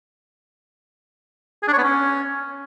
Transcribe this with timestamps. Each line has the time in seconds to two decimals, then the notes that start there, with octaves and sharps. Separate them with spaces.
1.63 G#4
1.68 D4
1.73 C#5
1.78 B3
1.83 C#4